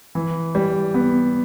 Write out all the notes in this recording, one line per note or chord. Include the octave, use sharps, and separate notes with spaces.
E3
G3
B3